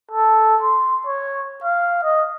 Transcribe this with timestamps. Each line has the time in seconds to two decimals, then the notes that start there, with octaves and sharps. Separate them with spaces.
0.11 A4
0.62 C6
1.07 C#5
1.64 F5
2.03 D#5